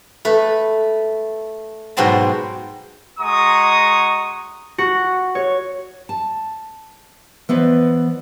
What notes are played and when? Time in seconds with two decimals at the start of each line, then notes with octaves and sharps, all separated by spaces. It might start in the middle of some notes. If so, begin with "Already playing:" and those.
0.25 A3 B4
1.97 G#2 B2 F#3 C5 G5 A5
3.19 G#3 F#4 A#5 C#6 D#6
4.78 F#4
5.35 C#5
6.09 A5
7.49 E3 B3 C5 D5 D#5